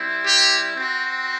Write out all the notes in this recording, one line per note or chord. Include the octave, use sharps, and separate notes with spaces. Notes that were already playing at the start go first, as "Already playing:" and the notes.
Already playing: G3 C4 E4
G4
C4 F#4